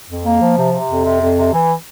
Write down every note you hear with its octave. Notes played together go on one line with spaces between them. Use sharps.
F2
A#3
F3
C3
C3
F2
C3
F2
C3
E3